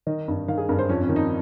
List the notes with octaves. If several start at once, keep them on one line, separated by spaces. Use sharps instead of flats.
D#3 D#5
G2
D#3 F5
G#4
G2 A#4
C5
F2 C#4
C#4
D#3
D#4